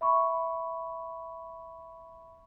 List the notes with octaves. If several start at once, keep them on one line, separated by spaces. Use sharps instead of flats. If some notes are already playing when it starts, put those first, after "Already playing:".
E5 B5 C#6